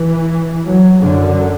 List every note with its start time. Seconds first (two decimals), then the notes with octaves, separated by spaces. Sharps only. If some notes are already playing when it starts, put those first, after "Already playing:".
Already playing: E3
0.65 F#3
1.02 F#2 D3